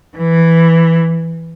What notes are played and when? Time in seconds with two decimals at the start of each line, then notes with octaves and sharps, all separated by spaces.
0.16 E3